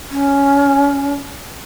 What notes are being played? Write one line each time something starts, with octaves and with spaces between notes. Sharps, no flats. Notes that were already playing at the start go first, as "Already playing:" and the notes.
C#4